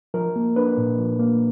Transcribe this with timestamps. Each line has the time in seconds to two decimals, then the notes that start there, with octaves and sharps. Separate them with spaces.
0.14 F3 A#4
0.36 A#3
0.56 D4 B4
0.78 A#2
0.98 F3
1.20 A#3